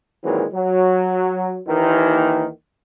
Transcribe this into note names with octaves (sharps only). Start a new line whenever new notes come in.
A#2 D#3 E3 F#3 G#3 C4
F#3
D#2 D#3 E3